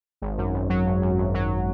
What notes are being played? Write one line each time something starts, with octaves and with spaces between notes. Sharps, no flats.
G#1
F#2
G#1
F#3
G#1
F#2
G#1
F#3